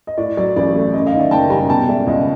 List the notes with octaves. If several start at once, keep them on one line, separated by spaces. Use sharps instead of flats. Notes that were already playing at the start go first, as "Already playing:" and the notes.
D#5
A2 D5
F#3 D5
A1 D5
A3
F#2 D#5
D#5 F5
D#3
D5 E5
F#1 G5 A5
G3 G#5 A#5
B2 G5 A5
G#3 D5 E5
C#2 D#5